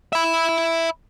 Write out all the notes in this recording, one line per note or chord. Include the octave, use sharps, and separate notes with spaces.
E5 B5